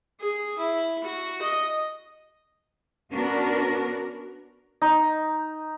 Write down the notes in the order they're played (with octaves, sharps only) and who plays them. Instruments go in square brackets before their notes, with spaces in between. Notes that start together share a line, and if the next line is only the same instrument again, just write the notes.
[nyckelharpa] G#4
E4
F#4
D#5
[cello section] B3 C#4 D4 F#4 A#4
[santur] D#4